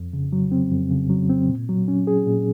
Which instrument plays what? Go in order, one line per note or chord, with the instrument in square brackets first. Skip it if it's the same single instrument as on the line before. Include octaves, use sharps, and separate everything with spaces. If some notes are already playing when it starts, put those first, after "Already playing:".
Already playing: [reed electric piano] F2
C#3
F#3
C4
F2
C#3
F#3
C4
A#2
F#3
C#4
G#4
A#2